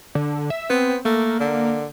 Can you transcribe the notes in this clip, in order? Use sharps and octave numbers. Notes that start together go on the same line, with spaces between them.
D3
E5
B3 C4
A3 A#3
D3